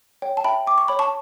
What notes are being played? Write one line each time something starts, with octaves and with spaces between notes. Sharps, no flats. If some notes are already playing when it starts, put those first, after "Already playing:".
C#5 G5
A5
E5 G5 B5
G5 D6
C#6
C#5 B5
A5 C#6